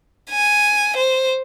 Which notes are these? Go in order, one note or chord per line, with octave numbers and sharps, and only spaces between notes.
G#5
C5